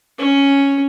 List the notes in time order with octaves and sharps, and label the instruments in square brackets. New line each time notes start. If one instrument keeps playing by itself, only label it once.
[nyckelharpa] C#4